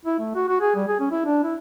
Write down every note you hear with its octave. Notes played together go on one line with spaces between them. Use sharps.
E4
A3
F#4
F#4
G#4
G3
G#4
C#4
E4
D4
E4